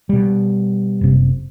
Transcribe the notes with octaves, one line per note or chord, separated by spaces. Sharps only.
B2 G3
F#1 C3